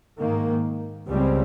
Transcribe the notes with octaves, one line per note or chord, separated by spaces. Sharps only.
G#2 D#3 A#3
C#2 C#3 G3 C4